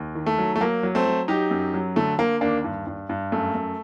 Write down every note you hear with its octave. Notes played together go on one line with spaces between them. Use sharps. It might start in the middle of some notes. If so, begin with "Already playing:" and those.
Already playing: D#2
D#3
A3
F#3
A3
F#3 A#3
F#3
A3 C4
F#3
F#3 D#4 G4
F#2
F#3
D3 A3
D3 A#3
D#2 A#3 D4
G2
G2
G2
F#2 A3
F#2